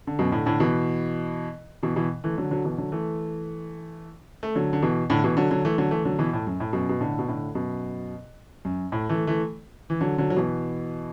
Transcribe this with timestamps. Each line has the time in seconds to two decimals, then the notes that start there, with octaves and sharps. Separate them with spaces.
0.07 D3
0.19 F#2 B2
0.32 A2 D3
0.46 A2 D3
0.60 B2 E3
1.83 B2 E3
1.96 B2 E3
2.24 E3 A3
2.38 D3 F#3
2.51 D3 F#3
2.65 B2 E3
2.78 D3 F#3
2.92 E3 A3
4.43 A3
4.55 D3 F#3
4.73 D3
4.82 B2 E3
5.10 A2 D3
5.24 B2 E3
5.37 D3 F#3
5.51 D3 F#3
5.65 E3 A3
5.78 D3 F#3
5.91 E3 A3
6.05 D3 F#3
6.19 B2 E3
6.33 A2
6.47 F#2
6.60 A2
6.73 F#2 B2
6.89 B2
7.00 A2 D3
7.19 B2
7.28 A2 D3
7.55 F#2 B2
8.65 F#2
8.92 A2
9.09 E3 A3
9.27 E3 A3
9.90 E3
10.01 D3 F#3
10.18 D3 F#3
10.30 F#3
10.37 B2 E3